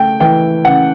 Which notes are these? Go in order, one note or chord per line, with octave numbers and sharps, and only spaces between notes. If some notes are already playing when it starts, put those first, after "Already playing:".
Already playing: C#3 A3 G5
E3 G5
C#3 F#5